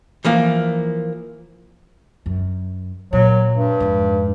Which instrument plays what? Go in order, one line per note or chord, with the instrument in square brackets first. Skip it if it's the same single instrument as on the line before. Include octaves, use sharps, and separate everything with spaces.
[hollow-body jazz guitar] E3 F3 A#3
[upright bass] F#2
[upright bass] A#2 [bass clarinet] F#3
[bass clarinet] G2
[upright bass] F2 G#2